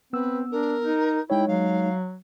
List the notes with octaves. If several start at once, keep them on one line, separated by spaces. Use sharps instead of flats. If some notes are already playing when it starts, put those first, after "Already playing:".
B3 C4 B4 E6
D4 A#4
D#4
G#3 D#4 E4 C#5 G5
F#3 F5